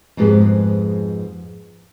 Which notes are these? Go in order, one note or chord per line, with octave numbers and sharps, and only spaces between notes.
F2 G#2 B3 G4 G#4 B4